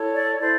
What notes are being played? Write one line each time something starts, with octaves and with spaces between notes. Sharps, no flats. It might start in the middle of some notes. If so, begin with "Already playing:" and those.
Already playing: E4 A4 C#5
D5
E4 A4 C5 D5